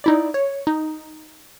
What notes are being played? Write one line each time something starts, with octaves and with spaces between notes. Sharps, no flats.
D#4 E4 D5
C#5
D#4